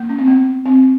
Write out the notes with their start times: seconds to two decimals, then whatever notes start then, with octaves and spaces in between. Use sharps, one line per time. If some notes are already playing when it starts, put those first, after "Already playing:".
Already playing: A#3
0.09 C#4
0.18 C4
0.28 B3
0.65 C4